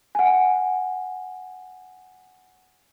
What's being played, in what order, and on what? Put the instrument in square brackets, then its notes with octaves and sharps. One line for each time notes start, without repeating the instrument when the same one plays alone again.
[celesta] F#5 G#5